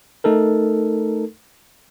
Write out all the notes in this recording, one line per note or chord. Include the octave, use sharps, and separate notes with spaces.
A3 D#4 A4 A#4